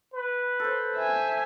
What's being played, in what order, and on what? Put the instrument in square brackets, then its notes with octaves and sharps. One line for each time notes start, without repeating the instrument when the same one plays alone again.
[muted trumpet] B4
[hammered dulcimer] A4 C5
[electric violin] E5 G#5